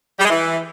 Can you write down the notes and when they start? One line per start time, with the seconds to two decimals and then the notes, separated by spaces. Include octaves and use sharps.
0.19 G3
0.25 G#3
0.30 E3